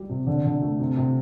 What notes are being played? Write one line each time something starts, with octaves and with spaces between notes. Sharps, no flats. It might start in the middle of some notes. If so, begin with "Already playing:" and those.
Already playing: G3 G4
C3
D3
D3
A3
C3
C3